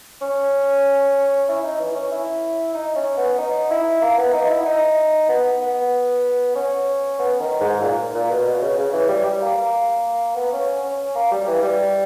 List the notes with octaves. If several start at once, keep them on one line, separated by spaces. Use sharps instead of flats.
C#4
E4
D#4
E3
C#4
E4
D#4
C#4
B3
D#4
E4
A#3
B3
D#4
E4
D#4
B3
B3
C#4
B3
D#3
G#2
A#2
A#2
B2
B2
C#3
C#3
E3
G3
G3
A#3
A#3
B3
C#4
C#4
A#3
G3
E3
G3